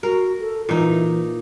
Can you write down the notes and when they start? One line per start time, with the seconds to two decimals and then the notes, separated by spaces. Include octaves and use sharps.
0.03 F#4 A#4
0.40 A4
0.69 A#2 E3 D#4